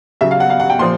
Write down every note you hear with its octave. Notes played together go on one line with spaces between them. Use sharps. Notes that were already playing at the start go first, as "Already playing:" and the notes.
C#3 F#3 E5
F5
F#5
F5
F#5
G5
A#2 F3 C6